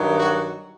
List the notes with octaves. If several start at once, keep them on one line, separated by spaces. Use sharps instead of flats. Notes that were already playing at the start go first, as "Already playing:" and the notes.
Already playing: G2 D#3 F#3
F#4